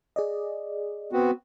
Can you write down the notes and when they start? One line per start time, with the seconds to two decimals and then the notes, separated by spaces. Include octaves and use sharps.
0.16 G#4 D5 D#5
1.13 B3 C4 F#4